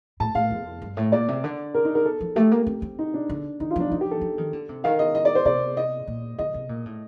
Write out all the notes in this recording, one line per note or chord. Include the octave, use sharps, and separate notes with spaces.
A2 A5
A2 F5
F2
G2
A2
A#2 D5
C3
D3
A#4
D#4
A#4
A4
F3
A3 G4
A#3
C4
C4
D#4
D4
D3
D#3 D#4
F4
F3 D4
F3 D#4
G4
A4
F3
D#3
D3
C3
D#3 F5
D#5
D#5
D5
C5
C3 D5
D#5
A#2
D3 D#5
C3
A#2
A2